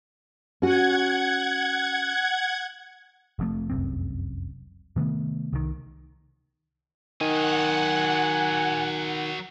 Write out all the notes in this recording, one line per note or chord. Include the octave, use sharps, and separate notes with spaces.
C#4 F#4 F#5 G#6
F1 F2 A3
F1 C2 F#2 C4
C3 D#3 A3 B3
C2 D#3
D#3 F#3 D#5 F#5 G#5